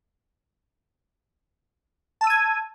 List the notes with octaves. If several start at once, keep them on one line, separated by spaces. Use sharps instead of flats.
A5 E6 G#6 D#7